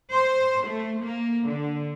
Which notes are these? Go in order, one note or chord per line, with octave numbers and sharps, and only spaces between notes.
C5
A3
A#3
D3